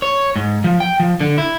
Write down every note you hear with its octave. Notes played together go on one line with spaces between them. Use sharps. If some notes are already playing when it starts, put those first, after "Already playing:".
C#5
G#2
F3
G5
F3
D3
E4